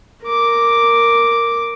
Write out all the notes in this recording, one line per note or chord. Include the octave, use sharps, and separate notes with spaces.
A#4 D6